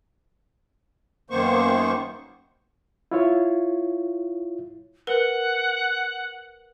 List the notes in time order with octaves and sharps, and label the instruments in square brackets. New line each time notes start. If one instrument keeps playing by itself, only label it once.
[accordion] F#2 D#3 A#3 B3 C5 C#6
[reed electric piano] E4 F4 C#5
[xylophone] A#4 B4 [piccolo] F#5